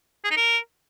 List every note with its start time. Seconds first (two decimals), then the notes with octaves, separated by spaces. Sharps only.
0.24 G#4
0.31 D#4
0.37 A#4